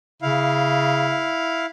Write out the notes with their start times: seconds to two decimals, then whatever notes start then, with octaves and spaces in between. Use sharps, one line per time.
0.22 C#3 E4 F5